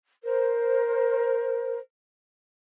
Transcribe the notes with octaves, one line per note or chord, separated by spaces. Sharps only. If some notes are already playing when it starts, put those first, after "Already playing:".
A#4 C5